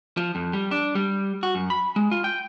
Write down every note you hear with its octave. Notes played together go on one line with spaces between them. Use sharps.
F3
F2
G3
D4
G3
F#4
F#2
B5
G#3
F4
G5